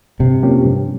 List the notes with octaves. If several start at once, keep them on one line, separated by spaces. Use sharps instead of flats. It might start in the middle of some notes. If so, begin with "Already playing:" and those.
G2 C3
F3 A#3 C#4 G4
G2